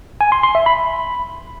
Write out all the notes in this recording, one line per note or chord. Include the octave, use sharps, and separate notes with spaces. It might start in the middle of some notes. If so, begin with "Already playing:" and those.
G#5
C6
C6
E5
B5